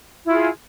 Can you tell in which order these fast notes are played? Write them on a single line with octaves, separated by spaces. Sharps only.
E4 F4 G#4